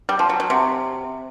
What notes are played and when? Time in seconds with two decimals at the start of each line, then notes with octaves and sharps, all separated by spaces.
0.09 G3
0.19 F3
0.29 F#3
0.40 F#3
0.50 C3